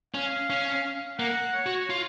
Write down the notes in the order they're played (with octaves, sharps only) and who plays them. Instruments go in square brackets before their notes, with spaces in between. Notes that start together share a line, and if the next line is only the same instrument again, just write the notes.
[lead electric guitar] C#4 [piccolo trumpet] F5
[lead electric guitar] C#4
[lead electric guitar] A#3 [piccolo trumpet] F#5
[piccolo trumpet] C#5
[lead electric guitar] F#4
F4